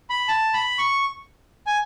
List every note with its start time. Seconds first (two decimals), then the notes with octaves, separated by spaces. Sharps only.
0.10 B5
0.28 A5
0.53 B5
0.78 C#6
1.67 G#5